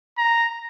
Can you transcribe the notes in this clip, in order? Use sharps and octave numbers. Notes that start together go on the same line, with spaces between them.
A#5